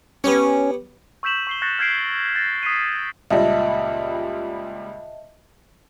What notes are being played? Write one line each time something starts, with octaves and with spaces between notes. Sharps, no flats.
B3 C#4 G4 C#5
C#6 E6 G6 B6 E7 F#7
C#6 C7 G7
C#6 F#6 G6 A6 A#6 C#7
F6 G6 G#6 B6 C7 D7
A6 A#6
D#6 B6 C7 D#7
C#2 A#2 G3 D#5 E5 A5